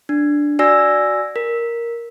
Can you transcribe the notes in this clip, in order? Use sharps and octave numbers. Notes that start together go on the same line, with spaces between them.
D4
F#4 D5 G#5 E6 A#6
A#4